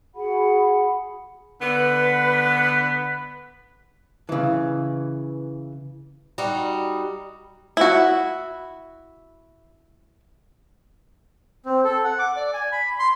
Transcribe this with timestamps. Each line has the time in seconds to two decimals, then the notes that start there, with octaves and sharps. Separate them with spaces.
0.15 F#4 G#4 F#5 B5
1.62 D3 B3 B4
4.29 C#3 E3
6.38 G3 D#4 F#4
7.77 E4 F#4
11.65 C4
11.84 A4
12.04 F#5
12.19 D6
12.36 D5
12.53 G#5
12.72 B5
12.99 C6